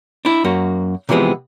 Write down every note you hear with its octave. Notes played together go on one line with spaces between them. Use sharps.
D4 E4
F#2 A#3 F#4
C3 E3 F3 G#3 B3 C4